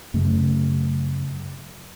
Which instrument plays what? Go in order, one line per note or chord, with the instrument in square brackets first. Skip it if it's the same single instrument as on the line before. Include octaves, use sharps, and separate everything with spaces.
[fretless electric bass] F#2 C#3 A3